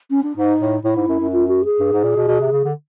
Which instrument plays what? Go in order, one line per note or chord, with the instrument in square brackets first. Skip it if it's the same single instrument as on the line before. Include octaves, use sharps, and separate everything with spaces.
[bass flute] C#4
D4
[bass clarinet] G#2 [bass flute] D#4
[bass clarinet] A2
[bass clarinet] A2 [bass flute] E4
[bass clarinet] G#2
F#2
F#2
[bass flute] F4
F#4
G#4
[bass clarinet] G2
G#2
A#2
B2
B2
C3
C#3
D3